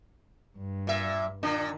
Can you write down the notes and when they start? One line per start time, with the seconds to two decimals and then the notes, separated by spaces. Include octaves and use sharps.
0.57 G2
0.87 A#2 E5
1.43 A#2 D#3 D4